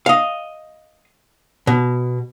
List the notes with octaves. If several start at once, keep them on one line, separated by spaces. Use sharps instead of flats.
D#5 F5
B2